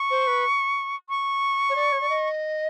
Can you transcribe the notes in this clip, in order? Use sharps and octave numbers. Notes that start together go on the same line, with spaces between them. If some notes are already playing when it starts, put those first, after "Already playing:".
Already playing: C#6
C5
B4
C#6
C#5
D5
C#5
D5
D#5